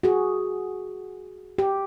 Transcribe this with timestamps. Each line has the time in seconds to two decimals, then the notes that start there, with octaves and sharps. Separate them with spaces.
0.03 F#4 G#4
1.58 G4